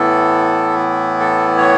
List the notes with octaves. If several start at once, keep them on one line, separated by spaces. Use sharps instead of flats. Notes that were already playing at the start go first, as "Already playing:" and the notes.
Already playing: A2 E3 B3 E4 A4
A4
C#5